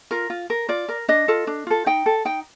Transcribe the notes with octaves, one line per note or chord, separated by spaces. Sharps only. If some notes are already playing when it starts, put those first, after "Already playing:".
F4 A#4
F4
A#4
F4 D5
A#4
D4 D#5
F4 A4
D4
F4 A4
D#4 G5
A4
D#4 G5